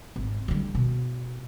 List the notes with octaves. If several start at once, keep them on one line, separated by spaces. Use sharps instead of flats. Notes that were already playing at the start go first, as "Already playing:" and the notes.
G#1
D3 G3
B2